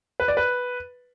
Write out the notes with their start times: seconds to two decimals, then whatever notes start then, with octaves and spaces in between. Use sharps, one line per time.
0.20 B4
0.28 D5
0.37 B4